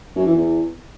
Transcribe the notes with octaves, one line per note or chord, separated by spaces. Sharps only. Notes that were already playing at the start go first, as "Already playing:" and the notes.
F#2
E3
E2